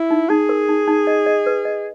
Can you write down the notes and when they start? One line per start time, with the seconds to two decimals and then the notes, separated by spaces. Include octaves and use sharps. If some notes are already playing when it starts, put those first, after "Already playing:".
Already playing: E4
0.10 D#4
0.29 D#4 G#4
0.49 A#4
0.69 D#4
0.88 D#4
1.07 D#5
1.26 D#5
1.46 B4
1.65 D#5